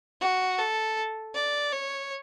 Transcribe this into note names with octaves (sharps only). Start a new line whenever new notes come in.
F#4
A4
D5
C#5